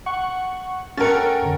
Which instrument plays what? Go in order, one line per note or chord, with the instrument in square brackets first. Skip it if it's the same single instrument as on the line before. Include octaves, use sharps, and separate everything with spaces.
[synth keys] F#5 C#6
[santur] A3 F#5 G5 [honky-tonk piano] C#4 A#4 [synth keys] A6 C#7
[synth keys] F2 D3